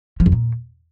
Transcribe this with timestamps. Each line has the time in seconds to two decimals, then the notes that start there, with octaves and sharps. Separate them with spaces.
0.20 F3
0.26 F2
0.32 A#2